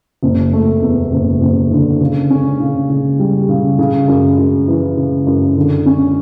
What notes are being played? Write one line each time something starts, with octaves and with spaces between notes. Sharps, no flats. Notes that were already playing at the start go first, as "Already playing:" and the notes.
F#1
A3
E2
F#1
F#1
D3
C#3
C#4
C#3
C#3
G3
C#3
C#3
F#2
F#2
E3
C#3
F#2
D3
C#4